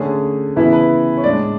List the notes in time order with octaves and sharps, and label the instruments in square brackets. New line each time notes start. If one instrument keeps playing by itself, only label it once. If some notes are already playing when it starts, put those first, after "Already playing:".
Already playing: [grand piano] D3 A3 C#4 G#4
C#3 E3 B3 E4 B4
B4
C#5
A2 G#3 D4 D5